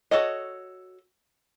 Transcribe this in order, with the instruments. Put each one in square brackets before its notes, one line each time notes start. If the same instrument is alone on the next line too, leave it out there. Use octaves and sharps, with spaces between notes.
[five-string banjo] F#4 A4 C#5 D#5